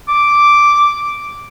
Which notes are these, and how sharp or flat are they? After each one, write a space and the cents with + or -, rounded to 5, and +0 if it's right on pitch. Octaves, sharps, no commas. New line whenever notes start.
D6 -5